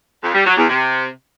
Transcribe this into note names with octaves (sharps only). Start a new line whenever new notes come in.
F2
G3
F#3
E2
C3